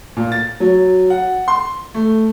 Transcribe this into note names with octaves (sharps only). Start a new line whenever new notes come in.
A#2
A6
F#3
F#5
C6
A3